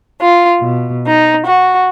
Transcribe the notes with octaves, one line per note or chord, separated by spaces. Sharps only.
F4
B2
D#4
F#4